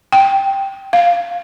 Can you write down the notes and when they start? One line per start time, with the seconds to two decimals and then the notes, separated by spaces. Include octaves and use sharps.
0.12 G5
0.93 F5